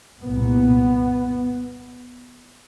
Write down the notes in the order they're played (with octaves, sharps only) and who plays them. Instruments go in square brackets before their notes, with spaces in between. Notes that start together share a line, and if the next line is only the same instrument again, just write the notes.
[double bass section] C2 A#2 B3